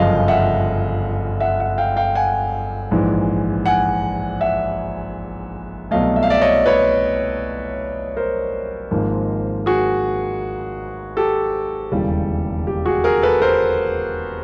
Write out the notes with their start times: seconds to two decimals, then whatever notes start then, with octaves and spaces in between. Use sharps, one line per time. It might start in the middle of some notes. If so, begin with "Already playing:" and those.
Already playing: G1 F#2 C#3 F3 D#5 F5
0.28 E5 F#5
1.40 E5 F#5
1.60 E5 F#5
1.78 F5 G5
1.97 F5 G5
2.15 F#5 G#5
2.91 A#1 G#2 E3
3.66 F#5 G#5
4.41 E5 F#5
5.91 C2 B2 F#3 A3 D#5 F5
6.16 E5
6.23 F5
6.30 D5 E5
6.41 C#5 D#5
6.66 B4 C#5
8.17 A#4 C5
8.91 G#1 G#2 F3 A#3
9.66 F#4 G#4
11.17 G4 A4
11.91 E1 D#2 C#3 E3 G3
12.67 G4
12.86 F#4 G#4
13.04 G#4 A#4
13.22 A4 B4
13.42 A#4 C5